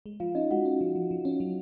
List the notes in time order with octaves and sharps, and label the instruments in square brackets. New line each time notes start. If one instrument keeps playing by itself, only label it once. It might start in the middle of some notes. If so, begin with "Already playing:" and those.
[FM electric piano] G#3
[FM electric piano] F3 [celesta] F4 F5
[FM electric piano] C#4 [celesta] D#4 D#5
[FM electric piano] G#3 [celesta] F#4 F#5
[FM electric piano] C#4
F3
F3
F3
C#4
F#3